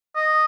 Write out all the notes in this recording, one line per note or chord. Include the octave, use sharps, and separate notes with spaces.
D#5